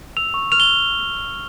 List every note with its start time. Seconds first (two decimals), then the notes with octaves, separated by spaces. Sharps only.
0.17 E6 F7
0.34 C#6
0.52 F6 F7
0.60 G7